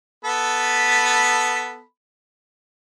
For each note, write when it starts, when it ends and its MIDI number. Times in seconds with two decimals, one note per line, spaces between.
0.25 1.82 59
0.25 1.82 69
0.25 1.82 83